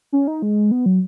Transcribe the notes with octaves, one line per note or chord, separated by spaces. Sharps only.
C#4
D#4
G#3
B3
F#3